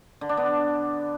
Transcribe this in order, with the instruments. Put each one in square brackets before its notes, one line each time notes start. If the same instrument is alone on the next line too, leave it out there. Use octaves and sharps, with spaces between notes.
[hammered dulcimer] D3
D4
B3